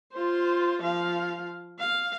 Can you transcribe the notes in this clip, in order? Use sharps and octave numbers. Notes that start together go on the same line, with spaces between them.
F4 C5
F3 F5
F5